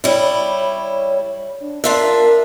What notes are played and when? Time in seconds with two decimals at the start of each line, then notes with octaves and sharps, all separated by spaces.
0.04 G3 E4 C#5
1.60 D4
1.84 D4 F4 A#4 E5